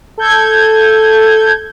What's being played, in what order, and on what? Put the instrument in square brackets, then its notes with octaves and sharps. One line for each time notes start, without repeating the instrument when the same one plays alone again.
[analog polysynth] A4 G6 G#6